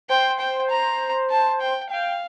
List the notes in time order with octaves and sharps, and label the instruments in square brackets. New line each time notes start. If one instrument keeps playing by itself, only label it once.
[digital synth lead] C5 [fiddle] G5
[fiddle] G5
A#5
A5
G5
[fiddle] F5 [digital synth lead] G5